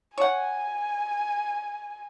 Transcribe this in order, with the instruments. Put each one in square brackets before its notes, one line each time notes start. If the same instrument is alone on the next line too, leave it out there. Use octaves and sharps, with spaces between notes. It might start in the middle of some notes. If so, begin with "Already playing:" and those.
[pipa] C#5 F#5 [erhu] G#5